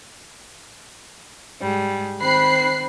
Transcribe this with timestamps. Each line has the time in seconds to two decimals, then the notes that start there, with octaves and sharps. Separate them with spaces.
1.61 G#2 G3 G#4
2.21 D#3 C4 B5 F#6 C7